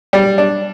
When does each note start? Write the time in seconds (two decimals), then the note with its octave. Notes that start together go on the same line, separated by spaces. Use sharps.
0.13 G3
0.38 D4